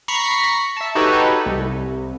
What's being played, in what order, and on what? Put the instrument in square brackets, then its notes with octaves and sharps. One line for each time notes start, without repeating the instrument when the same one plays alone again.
[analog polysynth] A#5 B5 C#6 B6 C7
E5 A5
D#4 F#4 G4 A4 B4 C#5
C2